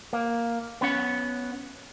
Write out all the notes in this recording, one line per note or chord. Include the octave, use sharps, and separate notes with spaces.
A#3
B3 C#4 F#5